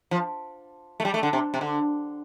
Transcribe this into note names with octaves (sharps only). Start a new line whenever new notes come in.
F3
A3
G3
A3
D3
C3
C3
D3